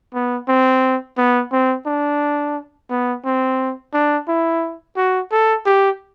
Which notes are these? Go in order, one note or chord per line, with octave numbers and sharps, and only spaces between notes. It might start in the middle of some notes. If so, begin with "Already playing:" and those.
B3
C4
B3
C4
D4
B3
C4
D4
E4
F#4
A4
G4